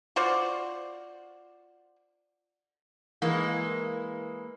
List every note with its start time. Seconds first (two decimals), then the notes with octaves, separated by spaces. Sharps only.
0.16 F4 F#4 C5 D5
3.22 E3 G#3 A#3